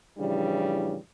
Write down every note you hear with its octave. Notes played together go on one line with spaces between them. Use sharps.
A2 C#3 E3 F3 G3 D4